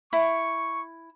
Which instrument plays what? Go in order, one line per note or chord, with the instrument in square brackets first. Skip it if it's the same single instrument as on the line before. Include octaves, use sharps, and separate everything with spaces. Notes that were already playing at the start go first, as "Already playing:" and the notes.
[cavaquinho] E4 [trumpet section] C#6